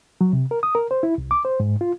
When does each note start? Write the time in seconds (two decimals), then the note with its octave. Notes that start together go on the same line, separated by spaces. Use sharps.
0.21 F#3
0.33 C3
0.51 A#4
0.63 D#6
0.75 A#4
0.91 C5
1.03 E4
1.18 C2
1.31 D6
1.45 C5
1.60 G#2
1.81 F4